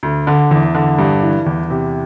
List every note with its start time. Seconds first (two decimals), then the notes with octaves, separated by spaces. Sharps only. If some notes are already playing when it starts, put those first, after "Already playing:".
0.03 D2
0.27 D3
0.51 E2
0.74 D3
0.98 G2
1.22 E3
1.46 E2
1.70 C3